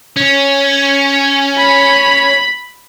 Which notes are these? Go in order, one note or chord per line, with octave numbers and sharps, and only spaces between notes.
C#4
B5